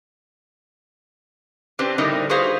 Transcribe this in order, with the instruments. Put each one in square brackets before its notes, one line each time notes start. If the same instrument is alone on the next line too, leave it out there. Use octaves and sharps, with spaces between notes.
[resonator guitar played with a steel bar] C4 D4 G4 B4 C5
A2 D3 G3 D#4 A#4 D#5
F#4 G#4 B4 C5 F5